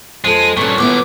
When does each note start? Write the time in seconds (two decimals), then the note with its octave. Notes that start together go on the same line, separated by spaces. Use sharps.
0.24 F2 G#3 A4 D#7
0.57 G2 A#2 E3 C#4 C#6
0.78 D#2 B3 E4 D6